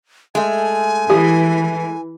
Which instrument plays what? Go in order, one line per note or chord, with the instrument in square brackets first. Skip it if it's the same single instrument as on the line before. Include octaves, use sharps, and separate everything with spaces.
[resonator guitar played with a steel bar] G#3 A3 [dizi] G#5
[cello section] E3 [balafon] G4